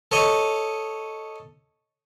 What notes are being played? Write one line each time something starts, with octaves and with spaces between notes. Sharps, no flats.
A4 C#5 D#5